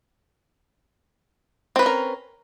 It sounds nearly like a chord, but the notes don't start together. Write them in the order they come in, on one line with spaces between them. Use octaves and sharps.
C4 B4 C#4 A#4